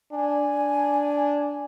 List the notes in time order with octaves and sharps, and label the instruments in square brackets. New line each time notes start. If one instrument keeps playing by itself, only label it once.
[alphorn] D4 [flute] G#5